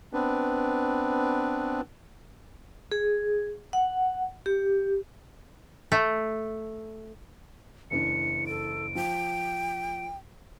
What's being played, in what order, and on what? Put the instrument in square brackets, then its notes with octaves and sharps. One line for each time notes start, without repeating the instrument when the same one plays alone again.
[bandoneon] B3 C4 D4 B4
[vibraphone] G#4
F#5
G4
[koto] A3
[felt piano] F#1 E3 D4 [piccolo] C#7
[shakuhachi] A4 [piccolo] D7
[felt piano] F3 [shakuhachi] G5